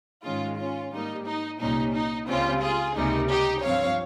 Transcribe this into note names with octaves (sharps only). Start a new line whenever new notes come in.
G#2 D#3 G#3 C#4 F4
C#4 F4
G#2 G3 A#3 D#4
D#4
C2 A#2 G3 C#4 D#4
D#4
C#2 C#3 G3 C4 C#4 F4
F4 G#4
C#2 C3 G3 A#3 D#4
D#4 G4
G2 F3 C4 C#5 F5